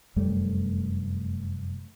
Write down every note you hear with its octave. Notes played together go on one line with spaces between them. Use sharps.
F1 F#2 G3 A3